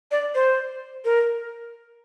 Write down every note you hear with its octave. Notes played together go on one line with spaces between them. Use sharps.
D5
C5
A#4